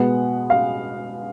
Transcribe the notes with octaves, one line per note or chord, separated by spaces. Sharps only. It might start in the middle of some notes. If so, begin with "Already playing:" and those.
Already playing: B2 G#3 B3 F#5
F5